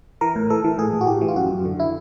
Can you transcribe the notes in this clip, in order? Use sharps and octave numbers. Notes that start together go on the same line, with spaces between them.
E3 A#4
A2
E3 A4
E3
A2 G#4
A2
F#4
A2 G4
E3
F4
F#2 F#4
F#2
D3
E4